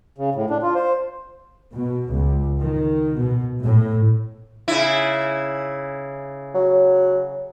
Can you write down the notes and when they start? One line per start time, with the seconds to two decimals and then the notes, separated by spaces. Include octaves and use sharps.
0.18 C#3
0.35 A2
0.50 D4
0.63 F4
0.75 C5
1.75 B2
2.10 C#2
2.59 D#3
3.16 B2
3.62 A2
4.68 C#3 E4
6.54 F#3